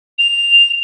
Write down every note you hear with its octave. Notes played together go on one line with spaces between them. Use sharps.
F7